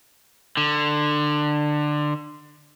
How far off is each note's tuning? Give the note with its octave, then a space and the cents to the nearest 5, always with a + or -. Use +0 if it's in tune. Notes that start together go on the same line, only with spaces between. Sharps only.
D3 +20